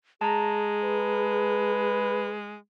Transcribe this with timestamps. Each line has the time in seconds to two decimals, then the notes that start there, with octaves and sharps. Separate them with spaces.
0.21 G#3 G#4 A5 A#5
0.84 B4